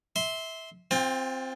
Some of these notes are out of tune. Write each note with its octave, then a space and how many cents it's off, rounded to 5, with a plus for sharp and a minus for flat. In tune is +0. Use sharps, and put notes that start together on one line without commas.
E5 -20 C6 +0
C4 +0 F4 +20 G5 +45